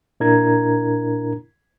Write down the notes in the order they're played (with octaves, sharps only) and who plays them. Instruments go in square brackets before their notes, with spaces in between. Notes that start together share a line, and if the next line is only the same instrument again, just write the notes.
[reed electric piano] A#2 D4 E4 A#4 A#5 G#6